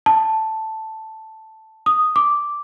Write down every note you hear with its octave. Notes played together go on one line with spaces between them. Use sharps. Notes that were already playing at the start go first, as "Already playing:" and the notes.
A5
D#6
D6